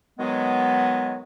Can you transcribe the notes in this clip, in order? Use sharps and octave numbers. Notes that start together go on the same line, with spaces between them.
B2 D#3 F#3 G#3 B3